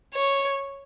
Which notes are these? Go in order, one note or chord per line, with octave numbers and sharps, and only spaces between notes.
C#5